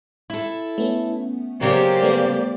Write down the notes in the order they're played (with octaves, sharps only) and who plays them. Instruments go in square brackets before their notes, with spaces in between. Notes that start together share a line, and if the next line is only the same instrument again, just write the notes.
[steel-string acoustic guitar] E4 A4
[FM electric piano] A3 B3 C#4
[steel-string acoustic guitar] C#3 F#3 [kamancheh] A#3 D5 [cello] G4 C5
[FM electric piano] G3 A3 B3